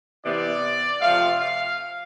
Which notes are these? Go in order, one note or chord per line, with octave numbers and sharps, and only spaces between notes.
C3 E3 B3 D5
C3 F3 A3 F5
F5